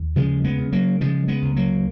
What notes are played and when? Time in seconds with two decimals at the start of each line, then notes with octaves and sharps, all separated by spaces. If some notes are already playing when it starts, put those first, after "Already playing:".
Already playing: D#2
0.16 C#3 F3 G#3
0.44 G#3 B3
0.59 C#3
0.72 F#3 A#3
1.01 C#3 F3 G#3
1.28 G#3 B3
1.42 C#2
1.56 F#3 A#3